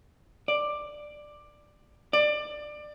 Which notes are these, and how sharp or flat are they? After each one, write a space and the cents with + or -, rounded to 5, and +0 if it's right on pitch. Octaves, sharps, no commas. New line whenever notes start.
D5 +10
D5 +25